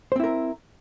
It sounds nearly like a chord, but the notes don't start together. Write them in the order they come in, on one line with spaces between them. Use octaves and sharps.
C5 C4 E4 A#4